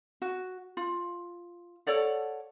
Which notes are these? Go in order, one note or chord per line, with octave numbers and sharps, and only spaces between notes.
F#4
F4
A4 C#5 D5 F#5